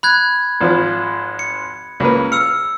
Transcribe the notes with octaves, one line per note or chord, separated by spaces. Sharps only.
B5 F#6 G#6
G#1 F3
C#7
C#2 A#3 B4
E6 F6 C#7